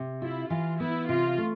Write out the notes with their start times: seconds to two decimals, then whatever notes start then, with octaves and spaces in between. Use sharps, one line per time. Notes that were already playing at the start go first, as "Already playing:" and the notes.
Already playing: C3
0.22 E4 F4
0.50 E3 F4
0.80 B3 E4
1.08 C3 F4
1.38 A3